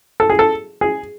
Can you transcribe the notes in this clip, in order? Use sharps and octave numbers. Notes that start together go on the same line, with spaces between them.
A4
G#4
A4
G#4